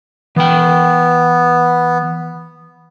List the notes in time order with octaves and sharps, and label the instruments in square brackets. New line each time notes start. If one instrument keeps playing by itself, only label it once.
[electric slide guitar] E3 G5 [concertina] B3